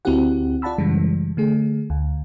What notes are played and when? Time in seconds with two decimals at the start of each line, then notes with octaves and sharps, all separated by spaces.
0.05 D2 C4 E4 F#4 G4 F#5
0.62 F4 D5 F#5 A5 B5 E6
0.78 F#2 C#3 E3 G3 G#3
1.37 D3 A3 G#4
1.90 D2